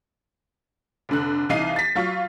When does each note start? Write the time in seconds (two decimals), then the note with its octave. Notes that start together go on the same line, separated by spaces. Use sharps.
1.09 F1 D3 F#6
1.49 C2 E3 D#4 F5 C7 D#7
1.76 A6 B6
1.95 F#3 F4 F5 C#6